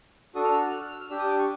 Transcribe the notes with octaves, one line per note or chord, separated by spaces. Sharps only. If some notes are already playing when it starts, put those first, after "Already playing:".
D4 F#4 A4 D#6
F6
E6
F6
F#6
F6
E6
F6
D4 G4 E6
D#6
D6
C#6